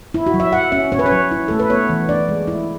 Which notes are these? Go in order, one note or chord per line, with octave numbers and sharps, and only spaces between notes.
E4
F#4
F#3
E5
F#3 F#5
C#4 E5
C#4 C#5
B4
C#5
F#3
E4
A3 A4
B4
B3 C#5
E3
D4 D5
G#3
E4